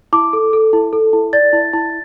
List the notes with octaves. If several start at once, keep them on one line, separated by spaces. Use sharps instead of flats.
E4 D6
A4
A4
E4
A4
E4
D5 A6
E4
E4